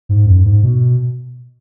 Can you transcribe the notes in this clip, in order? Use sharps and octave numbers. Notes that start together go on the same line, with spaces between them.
G#2
F#2
G#2
B2